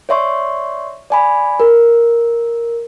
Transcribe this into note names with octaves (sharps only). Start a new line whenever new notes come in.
C#5 D5 E5 C6 C#6
D5 G#5 B5
A#4